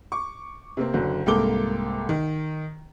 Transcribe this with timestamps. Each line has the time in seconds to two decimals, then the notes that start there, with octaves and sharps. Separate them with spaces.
0.12 C#6 D6
0.77 C3 A#3 C4
0.94 F#1 D3 F#3
1.26 C2 G#2 A#3 A4 D6 G7
2.09 D#3